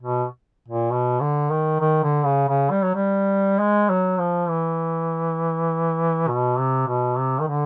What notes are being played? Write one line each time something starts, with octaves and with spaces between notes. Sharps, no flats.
B2
A#2
B2
D3
D#3
D#3
D3
C#3
C#3
G3
F#3
G3
G#3
F#3
F3
E3
B2
C3
B2
C3
D#3
D3